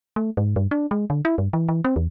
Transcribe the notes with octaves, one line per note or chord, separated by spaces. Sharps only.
A3
G#2
G2
D4
G#3
D3
E4
G2
E3
E3
C4
E2